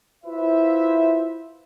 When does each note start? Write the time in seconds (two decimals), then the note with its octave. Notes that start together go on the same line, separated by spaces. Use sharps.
0.25 E4 F4 B4 C5 E5